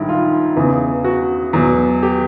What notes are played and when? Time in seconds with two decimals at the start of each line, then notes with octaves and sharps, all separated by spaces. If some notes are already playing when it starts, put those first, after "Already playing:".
Already playing: A#1 G#2 D#3 G3 E4
0.09 F4
0.56 E2 C#3 E3
1.04 F#4
1.53 E2 B2 F#3
2.03 G4